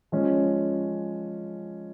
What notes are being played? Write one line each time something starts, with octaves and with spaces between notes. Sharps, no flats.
F3 G#3 C#4